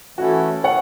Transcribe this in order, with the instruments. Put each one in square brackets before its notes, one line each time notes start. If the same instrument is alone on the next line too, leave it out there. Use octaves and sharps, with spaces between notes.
[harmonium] E3 A3 C#4 E4 A4 [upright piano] F#4
[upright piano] C#5 F#5